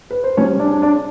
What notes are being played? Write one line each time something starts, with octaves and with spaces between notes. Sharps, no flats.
B4
C5
G3 C#4 C#5
D4 D5
D4
D4 D5